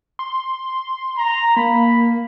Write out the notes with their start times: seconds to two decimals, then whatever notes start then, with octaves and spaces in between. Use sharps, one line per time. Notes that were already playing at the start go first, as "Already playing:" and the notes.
0.19 C6
1.18 A#5
1.56 A#3 B5